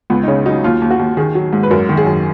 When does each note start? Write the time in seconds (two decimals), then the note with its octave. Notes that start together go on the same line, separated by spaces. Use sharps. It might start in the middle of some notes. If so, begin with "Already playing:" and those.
0.10 C#2 B3
0.23 D#4
0.28 C#3 C#4
0.46 F#3 D#4
0.64 D#2 F4
0.82 D#2
0.91 F#4
0.99 D#2
1.17 D#3 G#4
1.35 F#3
1.53 G#2
1.63 B4
1.71 F#2 A#4
1.89 D#3
1.97 G#4
2.07 F#2